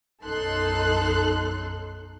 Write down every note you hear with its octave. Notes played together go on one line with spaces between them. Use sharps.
B1 F#2 D#4 A4 C6 F#6